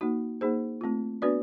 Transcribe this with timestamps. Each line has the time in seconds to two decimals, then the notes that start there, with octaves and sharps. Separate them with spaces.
0.01 A#3 D#4 F#4
0.41 A#3 D#4 G#4 C5
0.81 A3 C4 F4
1.22 B3 D4 F#4 B4 D5